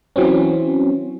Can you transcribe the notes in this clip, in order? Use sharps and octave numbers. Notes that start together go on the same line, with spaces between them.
E3 F#3 C4 C#4